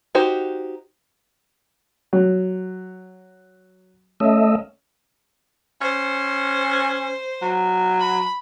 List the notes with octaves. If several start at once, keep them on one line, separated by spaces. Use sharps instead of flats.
D#4 F#4 G4 C5
F#3
A3 C#4 D#5 E5
C#4 C5
F#3
B5